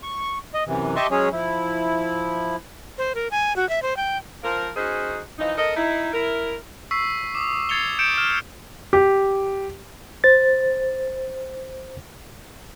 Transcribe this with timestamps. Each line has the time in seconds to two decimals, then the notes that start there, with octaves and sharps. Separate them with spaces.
0.03 C#6
0.54 D#5
0.67 F#2 C3 E3
0.96 G4 D#5 E5 A5 C6 C#6
1.11 F#3 G#3 C#4 G#4 C#5
1.32 F3 E4
2.98 C5
3.15 A#4
3.31 G#5
3.56 F#4
3.69 E5
3.82 C5
3.97 G5
4.43 F3 A#4
4.76 C#4 D#4 F#4 G#4 C5
5.39 E3 F3 D#4
5.57 A4 A#4 D#5
5.75 D#4 E4
6.13 E4 A#4
6.91 C#6 E6 B6 C7
7.35 D6 D#6
7.69 G#6 A6 C7 C#7 F7 G7
7.99 G6 C#7 D7 E7
8.18 F6 E7
8.93 G4
10.24 C5 A6